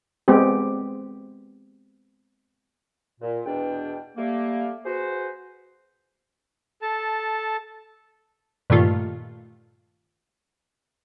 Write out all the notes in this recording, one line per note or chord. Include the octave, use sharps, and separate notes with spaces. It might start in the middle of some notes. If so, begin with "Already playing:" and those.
G#3 B3 C4 G4
A#2
E2 B2 D4 G5
G3 A3 A#3
F#4 G#4 B4 C5
A4 A5
G2 A#2 D#3 A3 F4